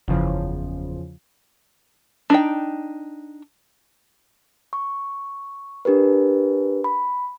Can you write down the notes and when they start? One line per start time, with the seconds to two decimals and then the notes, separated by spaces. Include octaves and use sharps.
0.08 F#1 E2 C#3 F3
2.30 D4 D#4 G5
4.73 C#6
5.85 D4 G4 A#4 B4
6.84 B5